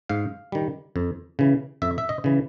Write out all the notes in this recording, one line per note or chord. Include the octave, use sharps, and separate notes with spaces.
G#2 F5
D#3 G3
F2
C#3 E3
F2 E5
E5
D#5
C#3 E3